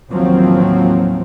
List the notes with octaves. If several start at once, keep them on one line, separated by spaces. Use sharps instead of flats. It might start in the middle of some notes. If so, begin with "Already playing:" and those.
A1 D#2 F3 F#3 C4